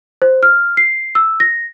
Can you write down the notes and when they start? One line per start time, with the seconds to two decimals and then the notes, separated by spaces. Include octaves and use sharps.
0.22 C5
0.43 F6
0.77 C7
1.15 E6
1.40 A#6